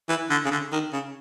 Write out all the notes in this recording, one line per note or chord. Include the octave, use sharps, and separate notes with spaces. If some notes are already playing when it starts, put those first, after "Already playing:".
E3
D3
C#3
D3
D#3
C#3